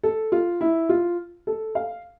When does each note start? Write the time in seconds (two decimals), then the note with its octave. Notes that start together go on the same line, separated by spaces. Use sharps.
0.03 A4
0.32 F4
0.61 E4
0.89 F4
1.47 A4
1.75 F5